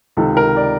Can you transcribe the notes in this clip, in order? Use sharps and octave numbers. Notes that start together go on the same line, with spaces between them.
C#2 C3 D#3 A4
A#4
D5